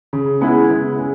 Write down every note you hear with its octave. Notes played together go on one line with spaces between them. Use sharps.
C#3
G#3 B3 E4
C#3
G#3